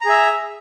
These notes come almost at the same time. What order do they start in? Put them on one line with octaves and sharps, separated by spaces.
A#5 G#4 E5